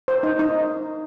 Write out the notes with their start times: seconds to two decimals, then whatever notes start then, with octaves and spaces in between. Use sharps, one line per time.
0.08 C5
0.23 D#4
0.39 D#4